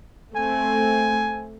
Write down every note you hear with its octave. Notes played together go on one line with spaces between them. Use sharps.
A3 C4 G#5